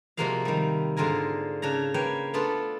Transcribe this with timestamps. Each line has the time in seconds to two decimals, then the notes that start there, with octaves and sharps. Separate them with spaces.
0.17 C3 F3 G#3 A#3 F#4 F5
0.45 D#3 G3
0.97 G#2 D3 F4 A#4 G#5
1.62 C#3 D4 C#5 A#5
1.94 A#3 B4 C#5 G5
2.34 A3 B3 D4 F4 A4